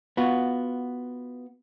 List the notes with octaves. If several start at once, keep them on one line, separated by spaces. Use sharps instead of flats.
B3 F4 F#4